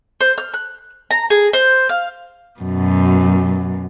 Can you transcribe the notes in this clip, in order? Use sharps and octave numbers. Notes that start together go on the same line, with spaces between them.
C5
F6
F#6
A#5
G#4
C5
F5
F#2 B2